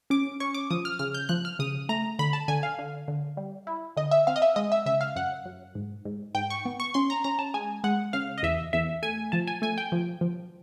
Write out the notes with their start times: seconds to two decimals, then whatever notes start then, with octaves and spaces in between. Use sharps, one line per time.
0.10 C#4 D6
0.40 C#4 C#6
0.54 D6
0.71 F3 D#6
0.85 F6
0.99 C#3 F6
1.14 G6
1.29 F3 F#6
1.45 F6
1.59 C#3 D#6
1.89 A3 A#5
2.19 D3 B5
2.33 A5
2.48 D3 G#5
2.63 F5
2.79 D3
3.08 D3
3.37 G3
3.67 E4
3.97 D3 D#5
4.11 E5
4.27 C4 F5
4.36 D#5
4.42 E5
4.56 G#3 D#5
4.72 E5
4.86 C#3 E5
5.01 F5
5.16 F#2 F#5
5.45 F#2
5.75 G#2
6.05 G#2
6.35 G#2 G5
6.50 C#6
6.65 B3
6.80 C#6
6.94 C#4 C6
7.10 A#5
7.24 C#4 A#5
7.39 A5
7.54 G#3 G#5
7.84 G#3 F#5
8.13 C#3 F5
8.38 D#5
8.43 E2 E5
8.73 E2 E5
9.03 A3 G#5
9.32 F3 A5
9.47 G#5
9.62 A3 G#5
9.78 G5
9.92 F3
10.21 F3